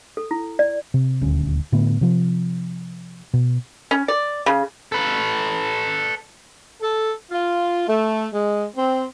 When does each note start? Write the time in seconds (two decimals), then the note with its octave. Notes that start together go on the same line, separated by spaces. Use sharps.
0.17 A4
0.31 E4
0.59 D5
0.94 C3
1.21 D#1 D2 C#4
1.72 A2 D3 A3 B3
2.01 C3 F3
3.33 B2
3.91 C#4
4.08 D5
4.46 C#3
4.92 A4 B4
6.81 A4
7.31 F4
7.88 A3
8.33 G#3
8.76 C4